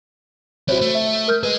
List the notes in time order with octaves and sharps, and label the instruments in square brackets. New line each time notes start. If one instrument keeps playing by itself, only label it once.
[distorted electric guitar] C4 E4 [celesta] F#4 C5 C#5
[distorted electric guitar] A3
[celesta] E5
A#4 F6 G6
[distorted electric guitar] G#4 D#5 [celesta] B4